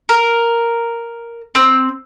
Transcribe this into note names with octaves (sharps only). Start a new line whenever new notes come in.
A#4
C4